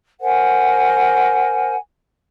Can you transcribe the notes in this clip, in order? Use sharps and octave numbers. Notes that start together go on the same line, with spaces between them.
A#4 C5 F#5 G#5